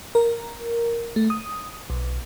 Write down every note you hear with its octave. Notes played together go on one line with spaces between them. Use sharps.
A#4
A3
D#6
B1